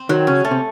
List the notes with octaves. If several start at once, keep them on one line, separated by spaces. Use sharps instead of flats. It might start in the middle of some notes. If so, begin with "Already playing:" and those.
Already playing: C4
D#3 F#3
C#3 C#4
A3
C3